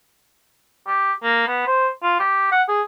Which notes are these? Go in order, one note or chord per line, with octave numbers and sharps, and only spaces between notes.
G4
A#3
B3
C5
F4
G4
F#5
G#4